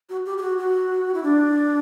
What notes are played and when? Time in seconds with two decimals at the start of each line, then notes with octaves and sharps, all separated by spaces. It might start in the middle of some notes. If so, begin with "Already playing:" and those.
0.10 F#4
0.26 G4
0.38 G4
0.42 F#4
0.58 F#4
1.14 E4
1.23 D4